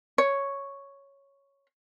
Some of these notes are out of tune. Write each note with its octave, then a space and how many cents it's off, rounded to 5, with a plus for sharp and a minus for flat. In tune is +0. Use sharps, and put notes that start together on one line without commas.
C#5 +0